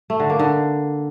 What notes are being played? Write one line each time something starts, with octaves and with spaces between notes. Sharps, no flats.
A3
D3
A#3
D3